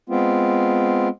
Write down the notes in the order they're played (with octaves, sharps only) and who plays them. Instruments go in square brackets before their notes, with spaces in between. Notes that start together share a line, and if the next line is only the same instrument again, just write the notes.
[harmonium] G#3 B3 C4 F4